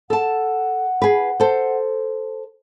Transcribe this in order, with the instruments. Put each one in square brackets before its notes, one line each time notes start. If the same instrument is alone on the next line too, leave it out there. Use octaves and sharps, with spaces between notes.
[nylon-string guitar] A4 A5 [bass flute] F#5
[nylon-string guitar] G#4 B4
A4 C5